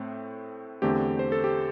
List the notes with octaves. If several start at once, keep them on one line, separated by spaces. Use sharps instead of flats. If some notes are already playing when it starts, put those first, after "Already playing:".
Already playing: A2 A3 C4
E2 D3 A3 C4 G4
C5
A4
G4